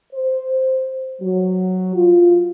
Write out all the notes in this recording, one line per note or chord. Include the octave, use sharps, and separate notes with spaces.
C5
F#3
F4